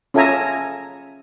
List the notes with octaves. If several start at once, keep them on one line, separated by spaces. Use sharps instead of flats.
C#4 F4 A4 E5 G#5 A#5